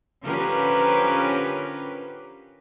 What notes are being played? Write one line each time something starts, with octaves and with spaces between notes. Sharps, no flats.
D3 F3 C#4 G4 A#4 B4